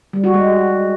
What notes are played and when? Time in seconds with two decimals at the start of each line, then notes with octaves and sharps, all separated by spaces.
0.13 G3
0.24 F#4
0.34 G#3